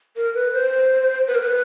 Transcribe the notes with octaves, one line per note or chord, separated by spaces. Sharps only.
A#4
B4
C5
B4
A#4
B4